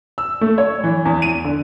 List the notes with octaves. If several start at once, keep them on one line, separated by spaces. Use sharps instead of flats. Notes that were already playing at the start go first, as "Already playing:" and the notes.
E6
A3
C#5
E3
E2
D#7
D3